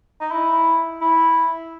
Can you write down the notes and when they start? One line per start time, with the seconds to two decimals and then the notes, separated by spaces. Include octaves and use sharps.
0.20 D#4
0.31 E4
1.01 E4